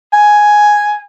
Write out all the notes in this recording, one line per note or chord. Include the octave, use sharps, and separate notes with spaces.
G#5